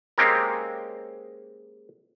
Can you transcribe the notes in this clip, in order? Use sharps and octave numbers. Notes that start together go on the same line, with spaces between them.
G#3 A#3 C4 C#4 G4 A#4